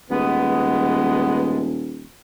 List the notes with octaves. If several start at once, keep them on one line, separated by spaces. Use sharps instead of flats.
D#1 G#3 B3